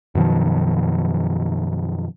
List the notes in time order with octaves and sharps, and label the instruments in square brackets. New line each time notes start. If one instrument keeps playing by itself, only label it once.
[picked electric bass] F#2 B2 D#3 F3